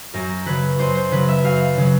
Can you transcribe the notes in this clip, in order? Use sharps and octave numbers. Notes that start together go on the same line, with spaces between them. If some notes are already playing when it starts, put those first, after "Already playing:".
F#2 A#4
C#3 F#3 B4
F#2 C5
C5
C#3 F#3 B4
E5
F#2 F5
C#3 F#3